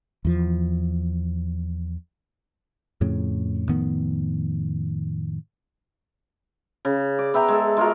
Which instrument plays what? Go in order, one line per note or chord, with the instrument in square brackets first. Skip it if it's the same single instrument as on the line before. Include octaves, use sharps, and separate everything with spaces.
[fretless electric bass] E2 F3
[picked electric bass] F2 A2 C#3
F2 A2 D#3 B3
[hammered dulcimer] C#3
D5
B3 E5 G5 A#5
G#3 A4
G#3 F4 F#4 A#4